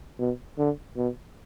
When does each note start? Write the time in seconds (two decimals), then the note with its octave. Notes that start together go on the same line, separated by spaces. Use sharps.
0.19 B2
0.59 D3
0.97 B2